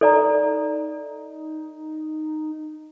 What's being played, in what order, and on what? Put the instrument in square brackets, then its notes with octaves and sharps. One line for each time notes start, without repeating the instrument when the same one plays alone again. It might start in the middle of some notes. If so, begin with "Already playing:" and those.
[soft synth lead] D#4 [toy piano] A4 D5 A#5